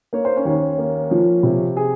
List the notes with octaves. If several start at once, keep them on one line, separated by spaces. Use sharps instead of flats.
A#3 C#5
C5
C#4 C#5
D#2
A#3
F3
C3
G#4